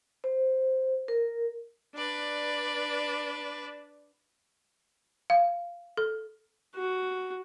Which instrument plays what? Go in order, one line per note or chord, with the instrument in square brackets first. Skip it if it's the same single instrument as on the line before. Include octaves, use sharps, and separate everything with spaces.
[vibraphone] C5
A#4
[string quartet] D4 B4 D5
[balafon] F5
A4
[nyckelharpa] F#4